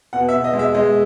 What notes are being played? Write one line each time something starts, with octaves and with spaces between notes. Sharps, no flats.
B2 F#5
E5
B2
D#5
G#3
E5
G#3 D#5